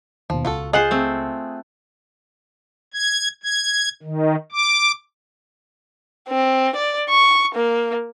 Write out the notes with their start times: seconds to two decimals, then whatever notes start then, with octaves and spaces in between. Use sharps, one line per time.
0.30 D#2 B2 F3
0.45 C#2 F4 F#4 A4
0.73 F4 G#4 C5 D#5 F5 F#5 F#6 F#7
0.91 A3 C4
2.94 G#6
3.43 G#6
4.03 D#3
4.52 D6
6.29 C4
6.76 D5
7.09 C#6
7.55 A#3